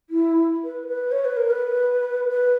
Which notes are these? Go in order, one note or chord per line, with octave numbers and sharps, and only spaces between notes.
E4
B4
B4
C#5
B4
A#4
B4
B4